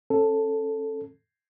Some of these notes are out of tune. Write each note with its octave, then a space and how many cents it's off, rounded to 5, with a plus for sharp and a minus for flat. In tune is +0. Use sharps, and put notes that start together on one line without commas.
C#4 -35 A4 +0